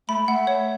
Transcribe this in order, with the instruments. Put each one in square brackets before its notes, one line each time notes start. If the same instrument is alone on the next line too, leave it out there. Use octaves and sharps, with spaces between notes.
[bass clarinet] A3 [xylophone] B5
[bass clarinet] A3 [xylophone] F#5
[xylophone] C#5